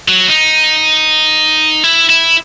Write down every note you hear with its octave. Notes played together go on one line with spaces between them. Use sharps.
F#3
D#4
E4
E4